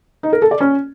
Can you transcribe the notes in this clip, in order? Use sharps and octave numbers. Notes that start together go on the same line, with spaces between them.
D#4
A#4
A4
D5
C#4